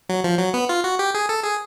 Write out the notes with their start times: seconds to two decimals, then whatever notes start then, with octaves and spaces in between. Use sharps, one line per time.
0.09 F#3
0.24 F3
0.39 F#3
0.54 B3
0.69 F4
0.84 F#4
0.99 G4
1.15 G#4
1.29 A4
1.44 G#4